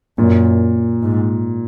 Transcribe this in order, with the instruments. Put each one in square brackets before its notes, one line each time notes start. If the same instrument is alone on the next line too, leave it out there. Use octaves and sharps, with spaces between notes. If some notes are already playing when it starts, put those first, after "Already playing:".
[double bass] F#2 [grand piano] A#2
[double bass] G#2